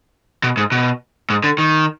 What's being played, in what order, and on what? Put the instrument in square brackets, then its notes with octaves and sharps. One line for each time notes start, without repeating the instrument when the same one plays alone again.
[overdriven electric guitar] B2
G#2
B2
G#2
D3
D#3